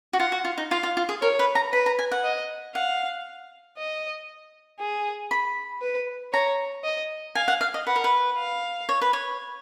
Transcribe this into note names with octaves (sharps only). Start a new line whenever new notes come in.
F#4
F4 F#5
F#4
F4
D#4
F4 F5
F4
F4
G#4
A#4 C#5
B4
A#5
B4 B5
A#5
G#5
F#5
D#5
F5 F#5
D#5
G#4
B5
B4
C#5 A#5
D#5
F5 G#5
F#5
F5
D#5
B4 F#5
A#4
B4
F5
C#5
B4
C#5